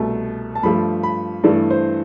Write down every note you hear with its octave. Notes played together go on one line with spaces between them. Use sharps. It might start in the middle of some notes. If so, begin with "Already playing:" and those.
Already playing: C2 B2 A3
A5
G2 F3 A3 B5
B5
G2 E3 A3 D5
C5